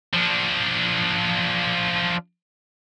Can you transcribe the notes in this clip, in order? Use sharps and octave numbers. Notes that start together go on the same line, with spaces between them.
F3 D4